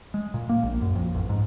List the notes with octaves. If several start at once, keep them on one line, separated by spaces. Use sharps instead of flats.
G#3
A#2
A#3
A#1
F#2
F2
A1
G#2